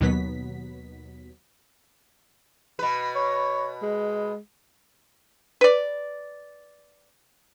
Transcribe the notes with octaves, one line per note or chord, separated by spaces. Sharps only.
D#2 B2 F#3 B3 B6
B2 B4
C#5
G#3
B4 D5